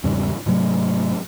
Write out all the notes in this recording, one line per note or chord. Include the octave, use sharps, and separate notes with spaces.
E2 G#2 C#3 G3
G#2 C3 F#3 A3